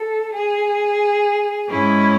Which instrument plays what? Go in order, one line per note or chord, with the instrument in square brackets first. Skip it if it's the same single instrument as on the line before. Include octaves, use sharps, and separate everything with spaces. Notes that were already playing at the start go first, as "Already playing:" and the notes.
Already playing: [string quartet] A4
G#4
G#2 G#3 C#4 E4